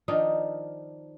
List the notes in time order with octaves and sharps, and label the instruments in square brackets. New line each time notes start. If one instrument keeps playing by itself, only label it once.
[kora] D#3 F3 D4 D#4